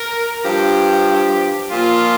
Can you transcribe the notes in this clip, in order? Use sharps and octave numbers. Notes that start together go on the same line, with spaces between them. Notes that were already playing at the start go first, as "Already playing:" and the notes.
Already playing: A#4
G2 F3 G4
A#2 F3 F4